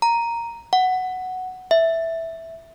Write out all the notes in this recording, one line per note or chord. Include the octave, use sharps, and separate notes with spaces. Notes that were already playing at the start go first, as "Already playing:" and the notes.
A#5
F#5
E5